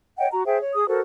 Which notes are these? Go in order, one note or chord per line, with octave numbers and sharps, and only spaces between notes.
C#5 D#5 F#5 G5
F#4 A#5
G#4 C5 E5 G5
C#5
G#4 D#6
F#4 A4 A#4 C5